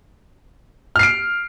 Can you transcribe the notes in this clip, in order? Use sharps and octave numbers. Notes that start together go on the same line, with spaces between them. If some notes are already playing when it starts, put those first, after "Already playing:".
F6 C7 D7